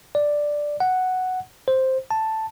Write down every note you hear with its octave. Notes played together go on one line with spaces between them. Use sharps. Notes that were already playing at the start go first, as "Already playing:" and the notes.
D5
F#5
C5
A5